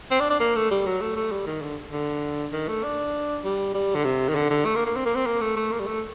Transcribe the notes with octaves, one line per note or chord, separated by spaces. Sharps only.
C4
D4
D4
A#3
A3
G3
F#3
A3
A3
G3
D#3
D3
D3
D#3
A3
D4
G3
G3
D3
C3
D#3
D3
D3
A3
A#3
A#3
C4
A#3
C4
A#3
A3
A3
A#3
G3
A3